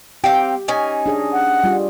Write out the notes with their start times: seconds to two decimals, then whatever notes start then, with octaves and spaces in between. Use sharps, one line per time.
0.24 C4 G4 F5 G5
0.68 C#4 D#4 G#5
1.06 D4 G#4 D#5
1.33 F#5
1.64 G3 F4